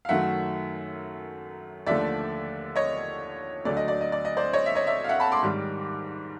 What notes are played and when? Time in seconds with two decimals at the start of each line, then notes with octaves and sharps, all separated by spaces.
0.05 F5
0.09 F#2 D#3 F#3 A3 E5 F#5
1.86 D#2 D3 F3 A3 D5 E5
2.76 C#5 D#5
3.65 D2 D3 F#3 A3 D5
3.77 D#5
3.88 D5
4.01 D#5
4.12 D5
4.25 D#5
4.37 C5 D5
4.53 C#5 D#5
4.66 E5
4.75 C#5 D#5
4.87 D5 E5
5.04 F5
5.09 E5 F#5
5.20 A5 B5
5.32 C6 D6
5.43 G#2 D#3 G3